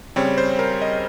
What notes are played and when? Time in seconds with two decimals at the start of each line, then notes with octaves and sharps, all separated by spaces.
0.16 C#3 G3 C4 C#5
0.38 C5
0.59 A#4
0.81 D#5